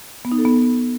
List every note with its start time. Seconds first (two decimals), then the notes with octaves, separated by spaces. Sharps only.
0.25 B3
0.32 D#4
0.38 A4
0.45 B3